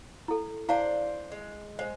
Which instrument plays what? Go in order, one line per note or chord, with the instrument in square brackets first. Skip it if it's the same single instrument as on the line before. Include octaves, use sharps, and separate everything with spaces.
[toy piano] E4 A4
[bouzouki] D4 C5 D5 [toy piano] E4 F5 A5
[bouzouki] G#3
[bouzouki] G#3 [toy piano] C5 D#5